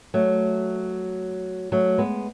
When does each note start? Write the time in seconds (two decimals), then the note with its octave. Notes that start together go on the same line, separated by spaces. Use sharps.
0.14 F#3 A3
1.72 F#3 A3
1.98 G#3 B3